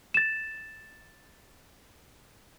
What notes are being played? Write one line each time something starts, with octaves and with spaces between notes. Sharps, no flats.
A6 E7